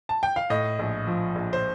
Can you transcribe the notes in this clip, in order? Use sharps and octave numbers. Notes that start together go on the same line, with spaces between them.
A5
G5
F5
A2 D#5
A#1
F3
A#1
C5